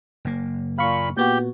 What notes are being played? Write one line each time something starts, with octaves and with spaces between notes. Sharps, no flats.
F#1 A#3
A#2 F5 B5 C#6
A#2 B3 F#4 G4 G6